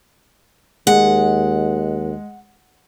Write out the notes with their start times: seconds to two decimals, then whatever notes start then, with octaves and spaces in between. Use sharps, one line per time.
0.87 D#2 G#3 F#5